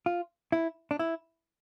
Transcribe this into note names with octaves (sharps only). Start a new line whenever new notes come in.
F4
E4
D4
E4